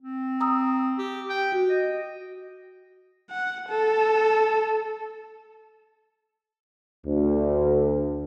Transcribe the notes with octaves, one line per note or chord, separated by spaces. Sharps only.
C4
A#5 D#6 E6
G4
G5
F#4
D#5
F#5
A4
D2